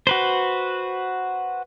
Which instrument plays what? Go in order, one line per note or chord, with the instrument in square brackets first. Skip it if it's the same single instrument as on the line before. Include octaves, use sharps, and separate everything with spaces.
[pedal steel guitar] F#4 B4 C5